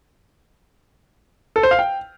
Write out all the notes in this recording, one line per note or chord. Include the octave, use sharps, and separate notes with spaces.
A4
C5
F5
G5